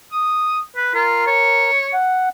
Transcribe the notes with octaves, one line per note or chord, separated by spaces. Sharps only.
D#6
B4
F4 A#4
C#5
F#5